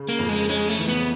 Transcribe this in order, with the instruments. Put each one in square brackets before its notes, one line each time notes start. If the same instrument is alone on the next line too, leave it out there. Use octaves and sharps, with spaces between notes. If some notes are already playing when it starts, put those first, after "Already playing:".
Already playing: [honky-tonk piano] C#3
[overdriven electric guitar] A#3
[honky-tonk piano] F2
[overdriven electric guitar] G#3
[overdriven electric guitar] G#3 [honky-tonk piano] C#4
[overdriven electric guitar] A3
[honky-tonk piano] E3
[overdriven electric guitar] B3